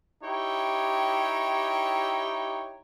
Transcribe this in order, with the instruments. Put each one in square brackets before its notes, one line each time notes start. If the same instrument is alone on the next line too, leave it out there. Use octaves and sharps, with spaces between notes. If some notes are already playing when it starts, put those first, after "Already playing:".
[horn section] D#4 E4 G4 C#5 G5